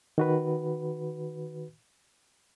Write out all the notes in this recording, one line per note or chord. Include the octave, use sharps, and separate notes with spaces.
D#3 F#4 B4